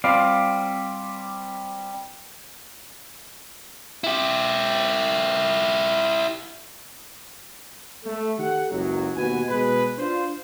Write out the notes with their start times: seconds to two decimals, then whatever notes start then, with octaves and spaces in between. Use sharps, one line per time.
0.04 G3 C4 F4 D5 F5
4.04 E4 G4
8.05 A3
8.39 D#3 G4 A4 F#5
8.71 F#1 C#2 F#2 F#3
9.16 D#2 B2 F#4 B4 G#5
9.49 B2 G#3 B4
9.98 D4 F4 C5